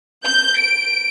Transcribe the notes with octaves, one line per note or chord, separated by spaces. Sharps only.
G6
D7